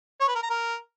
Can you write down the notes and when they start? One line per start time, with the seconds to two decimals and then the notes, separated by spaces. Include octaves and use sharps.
0.21 C#5
0.28 B4
0.35 A#4
0.43 A#5
0.50 A#4